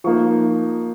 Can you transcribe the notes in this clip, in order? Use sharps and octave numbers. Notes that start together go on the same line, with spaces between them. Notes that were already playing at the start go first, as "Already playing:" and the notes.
F3 A#3 D#4 C#6